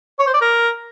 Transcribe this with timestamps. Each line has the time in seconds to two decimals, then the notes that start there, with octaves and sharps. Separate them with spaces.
0.19 C#5
0.26 C5
0.34 D5
0.41 A#4